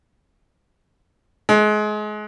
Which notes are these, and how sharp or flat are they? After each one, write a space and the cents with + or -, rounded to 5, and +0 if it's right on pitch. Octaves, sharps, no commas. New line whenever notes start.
G#3 +30